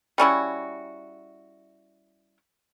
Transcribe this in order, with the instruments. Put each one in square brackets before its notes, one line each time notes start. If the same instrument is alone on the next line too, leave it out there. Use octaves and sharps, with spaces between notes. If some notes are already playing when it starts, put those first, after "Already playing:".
[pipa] G3 C#4 E4 F#4